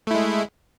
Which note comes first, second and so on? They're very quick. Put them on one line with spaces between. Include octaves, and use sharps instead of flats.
A3 E4 G#3